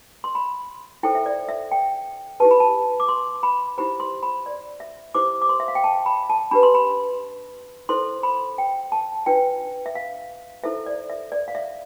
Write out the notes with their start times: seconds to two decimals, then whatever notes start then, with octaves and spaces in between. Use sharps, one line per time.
0.24 C6
0.35 B5
1.03 E4 A4 C5 G5
1.15 E5
1.26 D5
1.49 E5
1.71 G5
2.40 E4 G4 B4 A5
2.51 B5
2.60 A5
3.00 D6
3.08 C6
3.43 B5
3.78 E4 G4 C5 B5
4.00 C6
4.23 B5
4.46 D5
4.80 E5
5.15 E4 G4 C5 D6
5.42 D6
5.49 C6
5.60 E5
5.68 F5
5.75 G5
5.84 A5
6.06 B5
6.30 A5
6.51 D4 G4 B4 B5
6.63 C6
6.75 B5
7.89 E4 A4 C5 C6
8.23 B5
8.58 G5
8.92 A5
9.26 D4 F4 B4 G5
9.86 E5
9.95 F5
10.64 E4 A4 C5 E5
10.86 D5
11.10 E5
11.32 D5
11.48 F5
11.55 E5